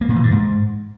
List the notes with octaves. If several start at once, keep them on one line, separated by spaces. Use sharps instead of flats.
A#3
A#2
E3
G2
G#2